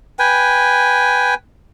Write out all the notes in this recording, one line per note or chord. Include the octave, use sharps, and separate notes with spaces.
B4 G5 G#5